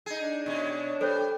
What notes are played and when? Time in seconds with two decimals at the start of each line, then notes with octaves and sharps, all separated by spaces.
0.06 D#4 G#4
0.19 D4
0.46 B2 C#4
1.01 G3 A4 C5 C#5